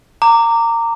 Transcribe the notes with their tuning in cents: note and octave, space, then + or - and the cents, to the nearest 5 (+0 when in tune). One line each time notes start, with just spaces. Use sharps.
A#5 -20 D6 +0